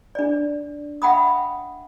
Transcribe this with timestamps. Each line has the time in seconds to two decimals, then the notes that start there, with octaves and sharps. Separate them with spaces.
0.15 D4 D5
1.02 E5 F#5 G5 B5 D#6